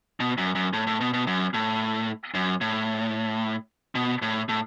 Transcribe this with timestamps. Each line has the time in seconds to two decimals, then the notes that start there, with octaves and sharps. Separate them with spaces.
0.20 B2
0.38 F#2
0.55 F#2
0.73 A2
0.87 A2
1.00 B2
1.13 B2
1.27 F#2
1.54 A2
2.34 F#2
2.61 A2
3.95 B2
4.22 A2
4.49 A2